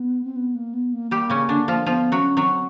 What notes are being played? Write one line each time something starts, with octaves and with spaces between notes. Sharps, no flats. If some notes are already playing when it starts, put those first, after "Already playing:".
Already playing: B3
C4
B3
A#3
B3
A#3
G3 A#3 G4
C#3 C#4
D3 D4
F3 F4
F3 B3 F4
F#3 C#4 F#4
F#3 C4 F#4